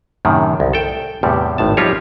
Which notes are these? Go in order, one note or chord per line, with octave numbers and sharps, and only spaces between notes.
F#2 A2 C3 D#3
C2
A4 G5
E2 A2 C3 G3
G#1 A2 A5
F3 G3 D#4 F4 G4 C#5